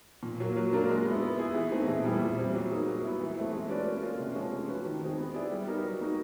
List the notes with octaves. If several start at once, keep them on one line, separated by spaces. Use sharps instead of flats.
A#2
F#3 A#3
F#3
A#3 D4 F4 A#4
G#3
B3 E4
B3
E4 G#4
E3
A3 C4 D#4 G#4
A#2
G3 B3 E4 G#4
A#2
G3 C4
F#3
A#3 D#4 G#4
F#3
B3 E4
E3
A3 C4 E4
G#3
C#4 F#4 B4 D5
A#3
C#4 F4 A4
C3
F3 G#3 C#4
A3
C#4 F#4 B4
D#3
G#3 C4 D#4 G#4
B3
E4 G#4 B4 D5
G3
B3 D#4 G4 A#4
F#3
A#3 D#4 F#4